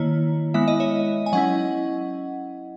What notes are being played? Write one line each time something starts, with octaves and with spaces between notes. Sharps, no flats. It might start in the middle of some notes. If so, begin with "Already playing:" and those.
Already playing: D#3 A#3 E4 C#5
G#3 B3 E4 E5
D#5
C#5 E5
G#5
F#3 C#4 E4 D#5 F#5